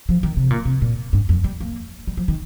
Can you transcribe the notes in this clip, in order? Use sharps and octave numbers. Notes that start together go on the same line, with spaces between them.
F3
D#3
C3
A#2
C3
A#2
G2
F2
G3
A#3
G3
F3
D#3